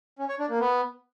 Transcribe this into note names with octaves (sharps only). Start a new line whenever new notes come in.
C#4
C#5
D4
A#3
B3